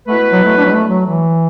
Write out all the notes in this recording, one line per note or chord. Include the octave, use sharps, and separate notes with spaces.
B2 A3 B3 E4 B4
F#3
A3
D4
F#3
A3
F#3
E3